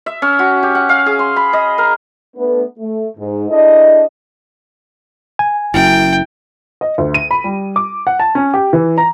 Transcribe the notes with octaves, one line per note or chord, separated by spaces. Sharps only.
E5
C#4
F#4
G4
F#5
F5
G#4
C6
B5
D#5
A#4
A3 B3 D4 B4
A3
G#2
D4 E4 G#4 A4 D#5
G#5
F#1 F#2 E4 G5
D#5
D2
D#7
B5
G3
D6
F#5
A5
C#4
G4
E3
A#5